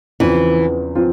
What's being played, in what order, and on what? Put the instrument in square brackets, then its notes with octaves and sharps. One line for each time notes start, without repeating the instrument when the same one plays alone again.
[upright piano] E2 C#3 F3 C4 F4 [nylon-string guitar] E3
[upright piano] F3 C4 F4